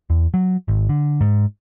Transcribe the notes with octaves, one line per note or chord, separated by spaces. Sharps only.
E2
F#3
G#1
D3
G#2